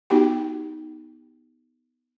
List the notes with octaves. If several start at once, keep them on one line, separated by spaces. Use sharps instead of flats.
B3 D#4 F#4 G4 G5